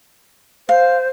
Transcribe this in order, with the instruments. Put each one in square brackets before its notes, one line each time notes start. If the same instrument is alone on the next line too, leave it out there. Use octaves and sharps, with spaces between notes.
[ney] C5 [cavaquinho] F5